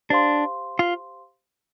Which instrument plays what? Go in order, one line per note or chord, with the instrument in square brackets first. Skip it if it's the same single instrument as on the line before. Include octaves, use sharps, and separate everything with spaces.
[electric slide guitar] D4 [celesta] G4 C5 F5 C6
[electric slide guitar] F4